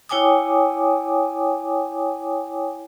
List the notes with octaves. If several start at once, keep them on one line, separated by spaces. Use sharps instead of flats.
E4 C#5 G5 G#5 D6 D#6